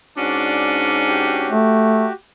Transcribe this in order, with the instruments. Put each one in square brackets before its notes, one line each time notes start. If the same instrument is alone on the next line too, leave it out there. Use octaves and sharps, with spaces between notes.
[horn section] G#2 C#4 D4 [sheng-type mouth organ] F#4 D5
[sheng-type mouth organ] F#4 G4
[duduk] A3